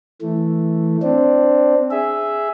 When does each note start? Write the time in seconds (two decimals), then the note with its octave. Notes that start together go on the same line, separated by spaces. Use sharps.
0.22 E3 A3
1.02 C4 D4
1.91 G#4 E5